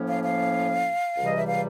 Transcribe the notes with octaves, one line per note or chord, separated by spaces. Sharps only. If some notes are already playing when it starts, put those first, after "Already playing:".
Already playing: A2 F3 A#3 C#4
F5
F5
C#2 C3 E3 G3
D#5
E5
F5